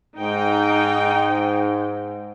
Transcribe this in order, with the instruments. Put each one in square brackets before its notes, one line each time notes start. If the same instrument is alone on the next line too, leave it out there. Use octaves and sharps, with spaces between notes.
[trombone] G#2 [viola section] D#4 G5